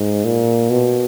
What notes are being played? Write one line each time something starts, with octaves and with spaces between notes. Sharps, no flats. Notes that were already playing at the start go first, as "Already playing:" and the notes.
Already playing: G#2
A#2
B2